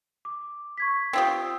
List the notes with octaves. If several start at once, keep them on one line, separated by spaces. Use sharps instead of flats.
D6
C#6 G#6 B6
C4 F4 G4 D#6 E6